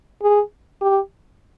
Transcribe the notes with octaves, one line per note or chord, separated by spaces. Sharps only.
G#4
G4